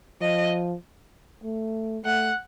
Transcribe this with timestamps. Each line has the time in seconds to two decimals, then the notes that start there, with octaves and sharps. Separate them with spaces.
0.21 F3 D#5
1.44 A3
2.04 A3 F#5